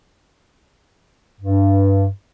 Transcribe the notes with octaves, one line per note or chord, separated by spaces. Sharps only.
G2